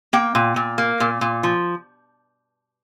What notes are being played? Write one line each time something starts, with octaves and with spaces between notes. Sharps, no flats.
A#3 G5
A#2
A#2
A#3
A#2
A#2
F3